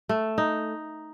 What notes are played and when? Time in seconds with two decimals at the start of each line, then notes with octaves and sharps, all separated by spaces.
0.09 A3
0.38 D#4